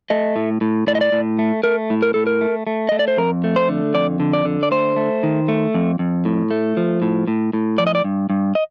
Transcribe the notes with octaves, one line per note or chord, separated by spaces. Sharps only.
A3 D#5
A2
A2
A2 D5
D#5
D5
A2
A3
A3 A#4
A2
A#4
A2 A4
A#4
A3
A3
A3 D#5
D5
C5
F2 A#4
A3
C5
D3
F2 D5
D3
D5
D3
D5
A3 C5
A3
D#3
A3
F2
F2
A2
A3
F3
A2
A2
A2
F3 D5
D#5
D5
G2
G2
D#5